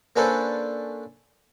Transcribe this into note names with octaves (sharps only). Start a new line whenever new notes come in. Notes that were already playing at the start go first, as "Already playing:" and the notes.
A#3 C#4 D4 A4 B4 C5